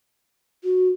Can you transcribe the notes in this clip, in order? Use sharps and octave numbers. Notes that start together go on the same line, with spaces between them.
F#4